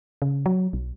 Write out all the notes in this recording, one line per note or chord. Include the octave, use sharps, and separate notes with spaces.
C#3
F#3
B1